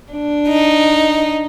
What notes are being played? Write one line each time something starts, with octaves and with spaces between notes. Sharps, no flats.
D4
D#4